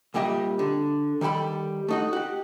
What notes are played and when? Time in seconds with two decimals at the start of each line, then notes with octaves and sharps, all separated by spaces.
0.14 C2 A#2 G3 G4 D#5 E5
0.59 D3
1.21 D#3 G3 A4 G5 B5
1.88 A3 D#4 F#4
2.13 F#4 G4